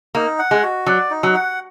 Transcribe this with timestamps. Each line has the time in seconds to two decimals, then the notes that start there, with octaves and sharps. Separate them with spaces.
0.15 A#3 D#4
0.39 F#5
0.51 G#3
0.63 F#4
0.87 F#3 D5
1.11 D#4
1.23 F#3
1.34 F#5